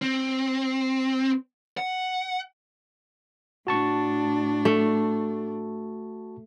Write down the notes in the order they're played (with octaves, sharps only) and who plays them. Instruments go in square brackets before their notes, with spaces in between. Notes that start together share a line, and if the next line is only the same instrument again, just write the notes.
[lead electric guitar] C4
F#5
[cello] A2 D4 [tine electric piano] F#4 A5 C#6
[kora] A3